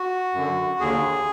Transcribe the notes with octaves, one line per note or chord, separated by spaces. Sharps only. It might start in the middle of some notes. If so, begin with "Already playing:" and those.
Already playing: F#4
F#2 D3
D#2 D3 G#4